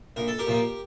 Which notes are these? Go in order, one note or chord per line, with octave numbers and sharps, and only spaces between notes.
A#1 A#4
A4
G4 A#4
A#2 F3 A#3